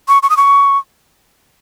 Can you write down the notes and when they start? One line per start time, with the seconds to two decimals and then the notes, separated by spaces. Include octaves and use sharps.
0.08 C#6
0.23 C#6
0.30 D#6
0.37 C#6